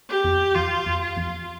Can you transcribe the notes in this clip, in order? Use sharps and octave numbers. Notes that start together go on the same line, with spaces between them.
G4
F2
F2 F4
F2
F4
F2